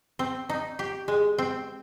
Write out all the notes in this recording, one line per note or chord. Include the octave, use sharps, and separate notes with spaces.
C4
D#4
G4
G#3
C4